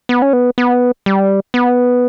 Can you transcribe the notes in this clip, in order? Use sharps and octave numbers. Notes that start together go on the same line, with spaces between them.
B3
C#4
B3
B3
G3
B3